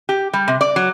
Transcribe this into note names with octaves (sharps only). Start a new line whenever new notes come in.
G4
G3
C3
D5
F#3